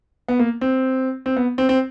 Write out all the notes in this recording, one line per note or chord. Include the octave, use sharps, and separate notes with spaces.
B3
A#3
C4
C4
B3
C4
C4